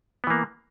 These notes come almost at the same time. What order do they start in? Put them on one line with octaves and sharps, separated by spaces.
B3 E3 A#3